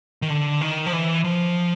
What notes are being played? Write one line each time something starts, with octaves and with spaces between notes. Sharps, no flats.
D#3
D3
D#3
F3
E3
F3